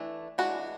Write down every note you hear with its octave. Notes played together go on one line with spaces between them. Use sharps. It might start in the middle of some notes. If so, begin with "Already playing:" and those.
Already playing: E3 A3 D4
E3 G#3 D4 F#4